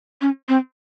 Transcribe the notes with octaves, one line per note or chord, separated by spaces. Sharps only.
C#4
C4